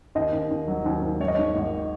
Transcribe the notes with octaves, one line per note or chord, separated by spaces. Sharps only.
D#2 D#5
D#2
D#2
F#3
D#2
D#2
G#2 C#5
D#5
G#2 C#5
G#1